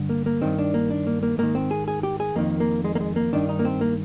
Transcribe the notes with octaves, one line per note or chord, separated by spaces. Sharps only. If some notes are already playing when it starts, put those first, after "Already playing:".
Already playing: G2 D3
A#3
A#3
G2 D#3 C4
D4
A#3
D4
A#3
A#3
G#2 D#3 A#3
C4
G#4
G#4
G4
G#4
F2 D#3 A#3
A#3
G#3
A#3
G#3
A#3
G2 D#3 D4
D#4
A#3
C4
A#3